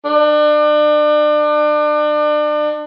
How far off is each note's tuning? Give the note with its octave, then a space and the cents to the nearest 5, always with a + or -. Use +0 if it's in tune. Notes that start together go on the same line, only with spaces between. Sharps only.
D4 +35